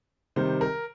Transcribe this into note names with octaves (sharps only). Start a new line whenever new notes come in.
C3 D#3 G3 C5
A#4